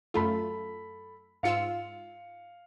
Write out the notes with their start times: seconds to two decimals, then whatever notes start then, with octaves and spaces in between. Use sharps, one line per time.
0.14 F#2 A3 F4 A4 B5
1.43 G#2 F4 F5 E6 C#7